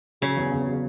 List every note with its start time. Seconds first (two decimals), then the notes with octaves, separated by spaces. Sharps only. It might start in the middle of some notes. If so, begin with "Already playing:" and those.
0.22 C#3 F#3
0.37 E2
0.52 E2
0.67 F#3